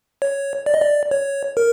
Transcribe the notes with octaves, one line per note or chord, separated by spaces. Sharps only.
C#5
D5
D#5
D5
C#5
A#4